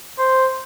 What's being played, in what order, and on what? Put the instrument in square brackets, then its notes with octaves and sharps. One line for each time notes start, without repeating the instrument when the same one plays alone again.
[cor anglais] C5